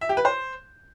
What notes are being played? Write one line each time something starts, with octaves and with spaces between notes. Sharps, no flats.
E5
G4
B4
C5